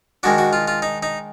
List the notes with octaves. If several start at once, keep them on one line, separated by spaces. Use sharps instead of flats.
D#3 G#3 D4 F#4
F#4
F4
F4
D#4
D#4